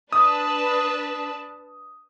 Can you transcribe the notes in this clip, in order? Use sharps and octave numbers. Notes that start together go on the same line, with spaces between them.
D4 B4 A5 D#6